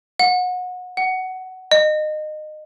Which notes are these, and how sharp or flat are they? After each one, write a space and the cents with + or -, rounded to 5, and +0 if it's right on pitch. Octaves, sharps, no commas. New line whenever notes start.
F#5 -30
F#5 +15
D#5 -25